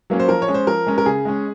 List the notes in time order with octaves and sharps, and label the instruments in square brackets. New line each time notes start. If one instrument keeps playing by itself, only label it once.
[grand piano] F#3 A#3 C#4
C5
F3 A#4
C#5
G#3 C#4
C5
F3 A#4
G#3 C#4
A#4
C#3 G#4
G#3 C#4